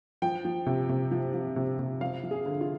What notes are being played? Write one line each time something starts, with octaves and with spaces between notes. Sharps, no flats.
F3 G5
F3
C3
C3
F3
F3
C3
C3
F3 F5
F3
G#4
D3
F4